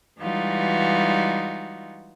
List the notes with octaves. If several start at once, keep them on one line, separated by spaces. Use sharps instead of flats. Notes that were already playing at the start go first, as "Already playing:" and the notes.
E3 G3 G#3 D#4 F4 F#4